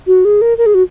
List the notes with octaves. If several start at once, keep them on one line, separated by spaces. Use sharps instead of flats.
F#4
G#4
A#4
A#4
G#4
F#4